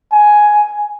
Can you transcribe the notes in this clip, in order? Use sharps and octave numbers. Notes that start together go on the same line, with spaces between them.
G#5